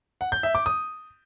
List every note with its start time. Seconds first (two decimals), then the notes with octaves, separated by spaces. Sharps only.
0.21 F#5
0.32 G6
0.43 E5
0.55 D6
0.66 D#6